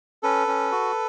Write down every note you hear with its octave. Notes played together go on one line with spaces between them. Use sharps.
C#4 A4 B4
C#4
F#4